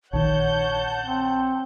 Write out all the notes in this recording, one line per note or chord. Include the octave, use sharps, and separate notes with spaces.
A#1 D#3 C#5 F#5 A5 G6
C4